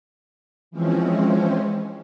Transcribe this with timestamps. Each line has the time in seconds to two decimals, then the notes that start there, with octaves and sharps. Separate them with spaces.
0.71 E3 F3 G#3 C4 C#4